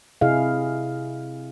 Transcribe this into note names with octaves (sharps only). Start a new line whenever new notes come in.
C3 E4 G#4 D#5 F5